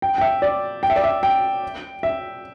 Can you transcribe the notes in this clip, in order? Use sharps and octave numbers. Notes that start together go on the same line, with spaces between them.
G5
G5
E5
D5
G5
E5
D5
E5
G5
E5